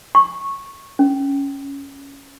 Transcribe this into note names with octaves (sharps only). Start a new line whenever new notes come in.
C#6
C#4